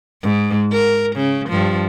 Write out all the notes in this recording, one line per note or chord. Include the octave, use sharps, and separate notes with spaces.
G#2
A#4
C#3
G2 F3